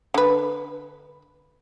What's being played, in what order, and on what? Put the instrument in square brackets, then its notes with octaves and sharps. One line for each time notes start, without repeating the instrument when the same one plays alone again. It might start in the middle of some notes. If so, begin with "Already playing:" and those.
[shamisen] D3 B4